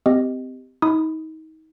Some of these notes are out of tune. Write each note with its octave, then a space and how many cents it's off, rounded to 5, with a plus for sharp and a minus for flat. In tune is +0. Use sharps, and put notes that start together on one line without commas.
C4 -30 G4 +0 D#5 +0
D#4 +30 B5 +10 D#6 +0